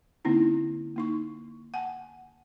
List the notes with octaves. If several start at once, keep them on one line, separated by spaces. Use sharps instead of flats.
D3 A#3 C4 C#4 D#4 E4
A#3 D#4 C#6
F#5 G#5 A5